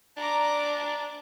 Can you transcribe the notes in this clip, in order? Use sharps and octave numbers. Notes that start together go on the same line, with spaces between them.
D4 A#5 D6